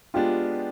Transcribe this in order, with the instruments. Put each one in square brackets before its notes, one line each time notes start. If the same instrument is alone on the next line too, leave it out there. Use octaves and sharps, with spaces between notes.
[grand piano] G#3 B3 D4 [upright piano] F4 G4